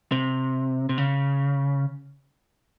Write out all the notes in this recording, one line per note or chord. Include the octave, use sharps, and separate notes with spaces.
C3
C3
C#3